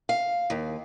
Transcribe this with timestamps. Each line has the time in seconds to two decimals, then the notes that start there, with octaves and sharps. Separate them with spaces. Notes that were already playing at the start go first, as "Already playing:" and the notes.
0.09 F5
0.50 D#2